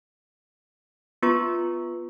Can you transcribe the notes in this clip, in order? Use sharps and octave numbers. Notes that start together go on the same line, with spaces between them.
B3 F4 B4 C#6